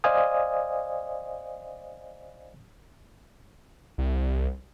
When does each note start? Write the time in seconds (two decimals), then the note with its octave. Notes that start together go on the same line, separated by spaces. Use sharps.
0.04 C5 D5 D#5 F5 G#5 D#6
3.98 C2